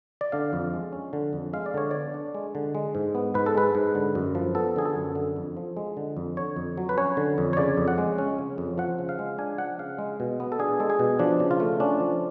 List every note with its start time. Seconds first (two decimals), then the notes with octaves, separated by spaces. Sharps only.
0.21 D5
0.32 D3 F5
0.53 F2
0.73 G#3
0.93 C#4
1.13 D3
1.33 F2
1.53 G#3 F5
1.66 D5
1.74 D3 C#5
1.91 B3 D5
2.14 D4
2.35 G#3
2.55 D3
2.75 G#3
2.95 G#2
3.15 B3
3.34 G#2 B4
3.46 A4
3.55 G#3 B4
3.75 G#2
3.95 D3
4.15 F#2
4.35 F3
4.55 B3 A4
4.76 D3 G#4
4.85 A4
4.96 F#2
5.15 D3
5.36 F2
5.57 F3
5.77 G#3
5.97 D3
6.17 F2
6.37 D3 C#5
6.56 F2
6.77 F#3
6.89 B4
6.98 C#4 C#5
7.17 D3
7.38 F2
7.53 C#5
7.57 C#3 D5
7.77 F2
7.88 F#5
7.98 G#3
8.18 C#4
8.39 C#3
8.58 F2
8.78 F3 F#5
8.99 C#3
9.09 F5
9.19 G#3
9.38 D4 G#5
9.58 F3 F#5
9.79 C#3 F5
9.98 G#3
10.20 B2
10.40 B3
10.52 A4
10.59 D4 G#4
10.80 G#3 A4
10.90 G#4
10.99 B2
11.19 F3 D4
11.40 C#3
11.51 F4
11.60 A3
11.80 C#4 D4
12.00 F3